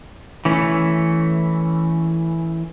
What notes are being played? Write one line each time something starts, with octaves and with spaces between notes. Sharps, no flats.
E3 A3 C#4